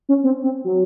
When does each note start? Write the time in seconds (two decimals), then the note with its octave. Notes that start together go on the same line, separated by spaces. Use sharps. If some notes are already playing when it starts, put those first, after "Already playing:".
0.09 C#4
0.24 C4
0.44 C4
0.64 F#3